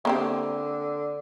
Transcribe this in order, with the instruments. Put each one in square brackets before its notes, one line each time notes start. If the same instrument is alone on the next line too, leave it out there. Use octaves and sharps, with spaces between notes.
[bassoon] D3 [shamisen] A#3 C4 G4